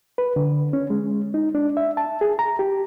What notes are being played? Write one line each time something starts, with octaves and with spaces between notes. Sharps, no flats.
B4
D3
C#4
G#3
D#4
D4
E5
A5
G#4
A#5
G4